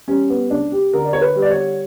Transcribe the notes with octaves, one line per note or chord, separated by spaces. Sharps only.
G3 C#4
B3
C#2 D4
G4
D3 A#4
D5
C#5
B4
G3
D5
C#5